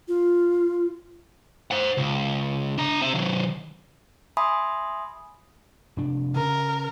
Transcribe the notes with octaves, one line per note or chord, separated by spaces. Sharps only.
F4
C5 F#5
C#2
D4 A#5
C4 E5
D#3 F#3
E5 G#5 B5 C6 D#6
F1 D4
C#3 A#4